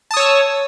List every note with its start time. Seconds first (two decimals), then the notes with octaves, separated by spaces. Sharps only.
0.11 A5
0.14 D#6
0.17 C#5
0.20 E6